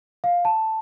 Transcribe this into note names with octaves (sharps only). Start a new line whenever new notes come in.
F5
A5